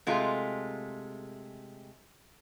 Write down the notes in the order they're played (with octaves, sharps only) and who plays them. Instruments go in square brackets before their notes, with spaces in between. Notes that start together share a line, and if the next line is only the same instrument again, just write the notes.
[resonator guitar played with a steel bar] C3 G#3 A3 F4